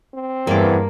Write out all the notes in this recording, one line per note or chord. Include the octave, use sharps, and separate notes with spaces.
C4
E2 G2 A#3 D6